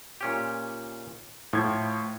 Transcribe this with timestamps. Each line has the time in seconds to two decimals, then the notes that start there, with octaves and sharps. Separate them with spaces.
0.21 A#2 C#4 G4
1.53 A2 F3 G#6